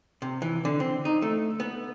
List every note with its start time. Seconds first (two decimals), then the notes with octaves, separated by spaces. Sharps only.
0.22 C3
0.42 E3
0.65 D3
0.80 C4
1.05 D#4
1.22 A3
1.60 B3